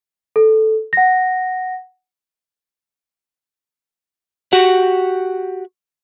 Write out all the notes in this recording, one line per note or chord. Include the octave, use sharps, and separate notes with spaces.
A4
F#5 A#6
F#4 G4 F#5